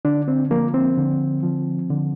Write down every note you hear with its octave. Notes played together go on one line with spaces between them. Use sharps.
D3 D4
C4
F3 A#3
C4
D3
F3
D3